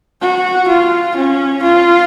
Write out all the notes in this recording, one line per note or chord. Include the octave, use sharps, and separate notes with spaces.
F#4
F4
C#4
F4